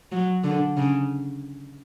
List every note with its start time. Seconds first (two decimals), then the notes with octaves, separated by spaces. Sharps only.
0.12 F#3
0.44 D3
0.77 C#3